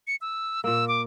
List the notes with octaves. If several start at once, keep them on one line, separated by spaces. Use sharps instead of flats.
C#7
E6
A#2 A#3 E6
D6